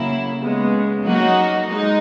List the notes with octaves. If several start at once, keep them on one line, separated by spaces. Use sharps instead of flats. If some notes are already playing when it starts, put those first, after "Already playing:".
Already playing: C#3 F#3 A#3 E4
C#3 G#3 B3
F#3 A#3 D#4 F#4
G#3 D#4